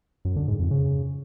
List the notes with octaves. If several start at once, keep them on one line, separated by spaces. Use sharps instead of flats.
F#2
D3
G#2
F2
C#3